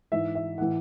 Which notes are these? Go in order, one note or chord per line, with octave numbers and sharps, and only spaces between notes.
G#2 E3 E5
E5
A2 E3 F#5